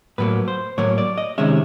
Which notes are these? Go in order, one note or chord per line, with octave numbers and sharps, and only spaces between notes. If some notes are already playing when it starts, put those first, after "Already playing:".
A2 F#3 A#3 B4
C5
A2 F#3 A#3 C#5
D5
D#5
C3 D#3 G#3 C#4 E5